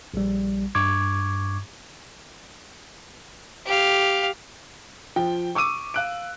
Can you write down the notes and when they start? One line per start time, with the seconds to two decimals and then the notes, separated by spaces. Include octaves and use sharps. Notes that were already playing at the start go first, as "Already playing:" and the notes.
0.14 A#1 G3
0.75 G2 C#6 D6 G#6
3.66 G4 F5
5.16 F3 G5
5.55 C#6 D6 E6 D#7
5.94 F5 F#6 D7